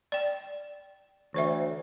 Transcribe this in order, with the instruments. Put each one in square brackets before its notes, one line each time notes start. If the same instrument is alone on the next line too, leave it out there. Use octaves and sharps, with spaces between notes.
[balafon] D5 G5
[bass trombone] D2 [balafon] E3 C5 E5